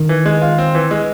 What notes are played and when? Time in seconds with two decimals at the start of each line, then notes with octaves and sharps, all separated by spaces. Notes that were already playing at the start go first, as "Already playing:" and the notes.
Already playing: D#3
0.09 E3
0.26 G#3
0.42 F4
0.58 C4
0.75 E3
0.91 G#3